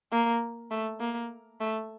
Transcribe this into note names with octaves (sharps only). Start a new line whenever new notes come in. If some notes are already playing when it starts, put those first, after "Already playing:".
A#3
A3
A#3
A3